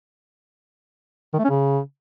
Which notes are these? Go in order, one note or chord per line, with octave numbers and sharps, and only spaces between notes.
D#3
A3
C#4
C#3